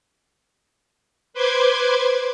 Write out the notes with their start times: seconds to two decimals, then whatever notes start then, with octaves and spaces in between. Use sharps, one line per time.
1.34 B4 C5 C6 D6 G#6